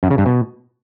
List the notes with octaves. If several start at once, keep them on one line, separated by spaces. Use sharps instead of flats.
F#2
C#3
G2
B2